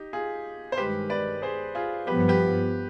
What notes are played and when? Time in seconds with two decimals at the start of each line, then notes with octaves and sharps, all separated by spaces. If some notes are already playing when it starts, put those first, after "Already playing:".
Already playing: D#4 G4
0.13 F4 G#4
0.72 C5
0.77 G2 D#3 G#3 G4 B4
1.10 B4 D5
1.42 G#4 C5
1.75 F4 G#4
2.07 G2 F3 B3 G4 B4
2.28 G4 B4